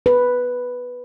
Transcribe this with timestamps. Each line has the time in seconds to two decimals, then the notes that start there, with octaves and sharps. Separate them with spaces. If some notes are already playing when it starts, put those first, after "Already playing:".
0.06 B4